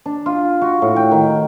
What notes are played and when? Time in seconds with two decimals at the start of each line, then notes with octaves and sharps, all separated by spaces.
0.06 D4
0.26 F4
0.62 F#4
0.82 A2
0.96 G5
1.12 D#3